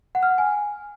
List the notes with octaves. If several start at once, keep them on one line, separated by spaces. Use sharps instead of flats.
F#5
F6
F#5
G#5